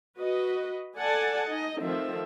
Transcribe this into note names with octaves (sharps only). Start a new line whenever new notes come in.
F#4 B4 D#5
A4 D5 F#5 G#5 A5
D#4 D#5
D#3 F3 A3 C4 E5